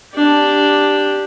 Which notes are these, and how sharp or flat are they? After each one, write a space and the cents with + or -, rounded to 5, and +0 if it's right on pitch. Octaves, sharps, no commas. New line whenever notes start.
D4 +0 G4 +0